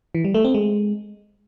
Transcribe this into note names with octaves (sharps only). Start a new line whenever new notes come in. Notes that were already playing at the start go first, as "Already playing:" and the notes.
E3
G3
A3
C4
G#3